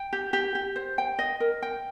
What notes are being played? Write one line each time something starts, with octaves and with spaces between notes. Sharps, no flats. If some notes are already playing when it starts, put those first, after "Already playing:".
Already playing: G5
G4
G4
G4
C5
G5
D#5
A#4
G5